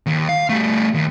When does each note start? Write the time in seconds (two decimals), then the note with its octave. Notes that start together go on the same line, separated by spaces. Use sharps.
0.06 D#2
0.29 F5
0.50 G3 A3
0.94 D#2